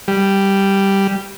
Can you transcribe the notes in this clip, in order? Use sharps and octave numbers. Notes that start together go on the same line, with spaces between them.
G3